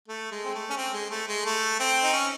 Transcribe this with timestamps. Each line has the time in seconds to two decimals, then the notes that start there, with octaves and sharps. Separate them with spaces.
0.08 A3
0.32 G#3
0.45 C4
0.54 A3
0.70 C#4
0.77 C4
0.93 G#3
1.10 A3
1.28 G#3
1.45 A3
1.80 C4
2.03 D#4
2.13 C#4